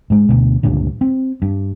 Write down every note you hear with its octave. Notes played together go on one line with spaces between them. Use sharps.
G#2 G#3
D2 B2
C#2 G2 A#2 D3
C4
G2